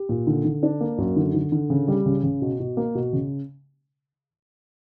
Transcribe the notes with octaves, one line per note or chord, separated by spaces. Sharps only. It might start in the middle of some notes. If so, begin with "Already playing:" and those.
Already playing: G4
A#2
D3
D3
D4
A#3
F#2
D3
D3
D3
C#3
G3
C#3
C#3
B2
B2
A#3
B2
C#3